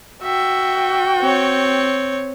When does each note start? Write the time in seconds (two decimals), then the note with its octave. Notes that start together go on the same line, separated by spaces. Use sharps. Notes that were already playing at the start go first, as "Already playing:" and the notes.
0.23 F#4 E5 G5
1.21 C4 C#5